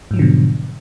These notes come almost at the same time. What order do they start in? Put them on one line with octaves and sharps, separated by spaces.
G#2 F#3 F3 D3 B2